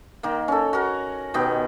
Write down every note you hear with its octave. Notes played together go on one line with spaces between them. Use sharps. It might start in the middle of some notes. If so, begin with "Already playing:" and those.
D#3 A#3
C#4 A4
F#4 A#4
B2 D#3 B3 G4